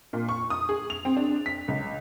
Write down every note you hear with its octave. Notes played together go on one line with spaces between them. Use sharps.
A#2
C#6
D#6
G#4
F7
C4
D4
B6
C#2